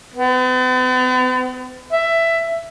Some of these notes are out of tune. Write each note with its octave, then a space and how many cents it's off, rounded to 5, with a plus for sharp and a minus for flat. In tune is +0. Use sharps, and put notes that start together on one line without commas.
B3 +45
E5 +10